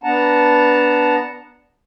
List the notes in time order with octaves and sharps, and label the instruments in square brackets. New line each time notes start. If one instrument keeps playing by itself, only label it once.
[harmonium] B3 D4 F#5 A5 A#5